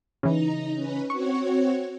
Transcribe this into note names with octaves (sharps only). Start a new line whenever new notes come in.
C#3 E3 D#4 A#5
C#4 B4
C4 F#4 C#5 C#6